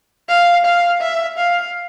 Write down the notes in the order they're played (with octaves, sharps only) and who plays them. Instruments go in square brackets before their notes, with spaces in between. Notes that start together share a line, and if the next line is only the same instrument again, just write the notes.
[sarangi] F5
F5
E5
F5